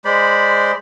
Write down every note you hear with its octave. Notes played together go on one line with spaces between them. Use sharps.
G#3 C5 D5 B5